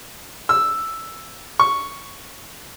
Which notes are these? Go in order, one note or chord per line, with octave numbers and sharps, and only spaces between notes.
E6
C#6